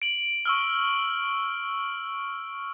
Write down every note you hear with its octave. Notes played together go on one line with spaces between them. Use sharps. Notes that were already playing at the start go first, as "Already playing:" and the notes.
D7 F#7
C#6 E6 F6